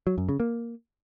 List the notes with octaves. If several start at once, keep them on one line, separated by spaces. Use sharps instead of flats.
F#3
F#2
C#3
A#3